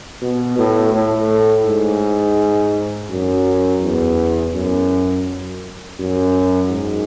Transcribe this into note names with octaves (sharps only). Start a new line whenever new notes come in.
B2
A2
A2
G#2
F#2
E2
F#2
F#2
G#2